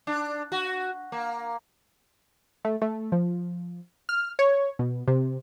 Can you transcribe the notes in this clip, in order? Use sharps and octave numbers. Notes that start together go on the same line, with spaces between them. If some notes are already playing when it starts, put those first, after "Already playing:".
D4
F#4
A#3
A3
A3
F3
F6
C#5
B2
C3